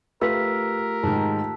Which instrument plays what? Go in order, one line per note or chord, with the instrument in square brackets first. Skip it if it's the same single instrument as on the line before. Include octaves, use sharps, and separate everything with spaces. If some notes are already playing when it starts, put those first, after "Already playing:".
[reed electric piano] A3 F4 G4 [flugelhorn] A#4 [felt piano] B4 [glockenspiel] E6 B6
[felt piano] G#2 D#3 [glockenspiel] A5